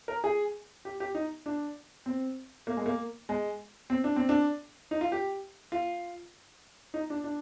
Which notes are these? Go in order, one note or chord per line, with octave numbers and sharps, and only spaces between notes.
A#4
G#4
G4
G4
D#4
D4
C4
A#3
G#3
A#3
G#3
C4
D4
C4
D4
D#4
F4
G4
F4
D#4
D4
D4